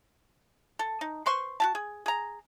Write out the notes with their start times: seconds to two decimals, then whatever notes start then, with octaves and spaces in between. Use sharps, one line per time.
0.79 A4
1.01 D#4
1.26 B4 C5 C6 C#6
1.60 F#4 G4 A5
1.75 G#4
2.06 G#4 A#5